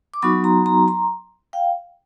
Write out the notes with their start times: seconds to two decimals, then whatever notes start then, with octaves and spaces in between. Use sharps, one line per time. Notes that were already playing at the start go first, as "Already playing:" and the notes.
0.14 D6
0.22 F#3 B3 D#4 F#4 B5 C#6
0.44 A#5 C6
0.66 A#5 C6
0.88 A#5 C6
1.53 F5 G5